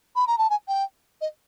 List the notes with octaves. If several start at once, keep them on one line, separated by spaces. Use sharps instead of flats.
B5
A#5
A5
G#5
G5
D#5